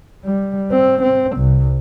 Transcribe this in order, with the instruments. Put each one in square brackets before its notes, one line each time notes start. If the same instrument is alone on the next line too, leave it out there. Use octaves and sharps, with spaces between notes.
[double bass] G3
C4
C4
C2